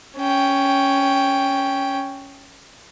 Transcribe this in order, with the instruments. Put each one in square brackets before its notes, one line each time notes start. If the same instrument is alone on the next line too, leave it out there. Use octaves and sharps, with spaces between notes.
[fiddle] C#4 G5